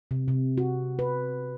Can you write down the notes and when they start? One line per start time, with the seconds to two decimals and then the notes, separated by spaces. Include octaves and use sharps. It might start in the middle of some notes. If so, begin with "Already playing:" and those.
0.11 C3
0.28 C3
0.58 F#4
0.99 B4